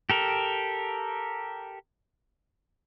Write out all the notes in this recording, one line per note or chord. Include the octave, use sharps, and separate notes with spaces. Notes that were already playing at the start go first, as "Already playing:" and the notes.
G4 A4 A#4